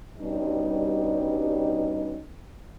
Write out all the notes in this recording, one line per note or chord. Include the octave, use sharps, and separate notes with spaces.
G2 B2 G3 C#4 D#4